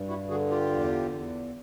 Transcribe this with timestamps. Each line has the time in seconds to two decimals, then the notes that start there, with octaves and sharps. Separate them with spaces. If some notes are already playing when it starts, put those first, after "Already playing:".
Already playing: G2
0.08 E4 F#4
0.28 D3 F#4 G#4
0.50 F4 G4
0.71 E2
1.13 E2